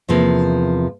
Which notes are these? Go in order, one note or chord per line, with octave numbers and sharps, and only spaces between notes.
E2 C3 F3 A#3